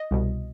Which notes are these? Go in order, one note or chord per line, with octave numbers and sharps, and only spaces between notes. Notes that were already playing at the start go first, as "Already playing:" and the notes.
Already playing: D#5
C2 B2